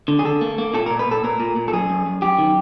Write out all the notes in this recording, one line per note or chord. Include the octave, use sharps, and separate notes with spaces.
D3
G#4
D3 A4
A#3
A#3
A#2 A4
A#2 A#4
B4
A#2 A4
A#2 A#4
A#2
A#2
A4
F#2 G#4
F#2
F#2
F#2 G4
D#3